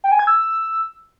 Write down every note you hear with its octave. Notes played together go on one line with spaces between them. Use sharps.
G5
G#5
G#6
E6